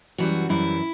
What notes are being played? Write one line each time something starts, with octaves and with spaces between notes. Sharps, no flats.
F#2 E3 G3 F#4
F#2 E3 G3 E4